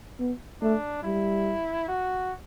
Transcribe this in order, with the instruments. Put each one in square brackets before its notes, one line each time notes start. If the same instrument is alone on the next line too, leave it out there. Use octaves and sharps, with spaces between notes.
[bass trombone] B3
[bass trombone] A3 [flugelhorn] D4
[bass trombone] G3 [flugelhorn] E4
[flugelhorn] F#4